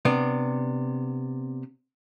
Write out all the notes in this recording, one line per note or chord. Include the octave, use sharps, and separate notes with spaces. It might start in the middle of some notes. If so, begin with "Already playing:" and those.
C3 B3 D4